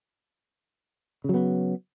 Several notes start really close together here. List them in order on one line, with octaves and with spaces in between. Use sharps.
C#3 F#3 B3